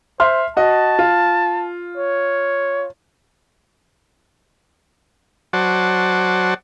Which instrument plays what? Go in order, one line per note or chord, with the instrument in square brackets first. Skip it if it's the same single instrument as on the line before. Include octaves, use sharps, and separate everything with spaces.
[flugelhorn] C5 [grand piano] E5 C6 F6
[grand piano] F#4 D#5 [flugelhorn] A5
[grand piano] F4
[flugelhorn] C#5
[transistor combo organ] F#3 F#4 C5 D5 F#5 A5